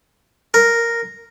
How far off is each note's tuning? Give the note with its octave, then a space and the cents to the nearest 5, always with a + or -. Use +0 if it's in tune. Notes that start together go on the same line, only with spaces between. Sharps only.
A#4 -5